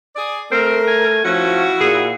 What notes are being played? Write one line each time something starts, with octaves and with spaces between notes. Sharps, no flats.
G#4 D5
A3 C4 A#4
G#5
F3 C#4 E4 F#4
A#2 G#4